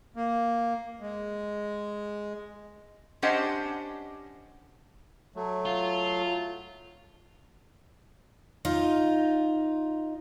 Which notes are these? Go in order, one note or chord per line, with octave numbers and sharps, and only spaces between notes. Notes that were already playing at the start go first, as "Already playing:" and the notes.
A#3
G#3
C#4 D4 G4 C5 D#5 F#5
F#3 A3
F4
D#4 F4